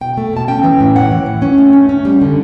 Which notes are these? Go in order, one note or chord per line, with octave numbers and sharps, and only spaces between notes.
B2 G5
A3
B2 A5
C#4 G5
E3
A2
E3 F#5
E3
E3
C#4
A3
C#4
C#4
G3
D3